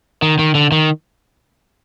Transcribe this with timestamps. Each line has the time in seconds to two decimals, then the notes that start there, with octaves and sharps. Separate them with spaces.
0.22 D#3
0.39 D#3
0.55 D3
0.72 D#3